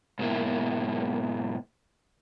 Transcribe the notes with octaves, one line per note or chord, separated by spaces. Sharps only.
G#2 B2 A#3 E4